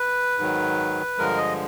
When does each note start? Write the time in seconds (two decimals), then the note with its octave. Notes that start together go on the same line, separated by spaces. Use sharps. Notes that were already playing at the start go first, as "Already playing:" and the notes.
Already playing: B4
0.39 G#2 D#3 F#3
1.18 G2 D3 F3 G#3 A#4
1.37 D#5